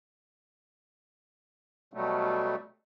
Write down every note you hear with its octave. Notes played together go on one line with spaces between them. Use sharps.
B2 F#3 G3 A3